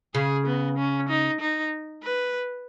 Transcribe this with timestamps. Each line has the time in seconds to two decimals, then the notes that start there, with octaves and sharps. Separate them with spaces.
0.14 C#3 G#4
0.46 B3
0.78 C#4
1.09 D#4
1.41 D#4
2.03 B4